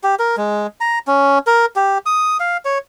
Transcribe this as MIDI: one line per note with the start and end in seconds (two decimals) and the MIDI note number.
0.03 0.15 67
0.19 0.36 70
0.37 0.67 56
0.81 0.99 82
1.07 1.39 61
1.47 1.66 70
1.76 1.98 67
2.06 2.37 87
2.40 2.57 77
2.65 2.78 73